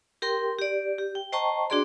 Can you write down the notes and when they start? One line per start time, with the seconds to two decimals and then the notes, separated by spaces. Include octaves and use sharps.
0.22 G4 A#4 G5 C6
0.58 G4 D5
0.98 G4
1.15 G5
1.32 C5 D#5 G5 A5 A#5 C#6
1.70 D4 F#4 G#4 D5 C6